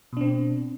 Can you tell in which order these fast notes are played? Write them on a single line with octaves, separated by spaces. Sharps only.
B2 D4 C4